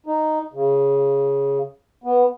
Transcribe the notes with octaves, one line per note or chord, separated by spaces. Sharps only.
D#4
C#3
B3